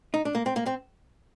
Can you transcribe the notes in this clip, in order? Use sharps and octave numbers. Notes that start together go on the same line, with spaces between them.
D#4
D4
A#3
C4
A#3
C4